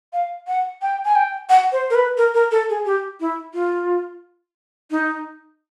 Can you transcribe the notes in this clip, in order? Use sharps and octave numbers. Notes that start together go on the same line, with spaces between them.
F5
F#5
G5
G#5
G5
F#5
C5
A#4
B4
A#4
A#4
A4
G#4
G4
E4
F4
D#4